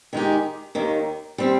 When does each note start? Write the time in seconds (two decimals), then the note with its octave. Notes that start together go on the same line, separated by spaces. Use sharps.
0.13 D#3 G#3 D#4 G4
0.75 D#2 D#3 A#3
1.38 G3 C4